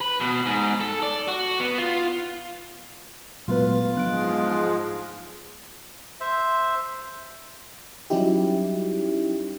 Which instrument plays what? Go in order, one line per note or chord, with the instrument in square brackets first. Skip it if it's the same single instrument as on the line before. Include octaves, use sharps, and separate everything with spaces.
[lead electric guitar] B4
B2
G#2
A4
D5
F#4
B3
F4
[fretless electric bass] A#2 G#3 A3 [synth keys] F#3 B3 B4 [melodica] F4
[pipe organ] G#2 F3 G#3 [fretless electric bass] F#3 B3 D4 [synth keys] F#6 D7
[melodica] C5 E5
[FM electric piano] F#3 G3 C#4 D#4 E4 G4